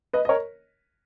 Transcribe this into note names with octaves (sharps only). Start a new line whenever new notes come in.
B4 D#5
D#5
A#4 C#5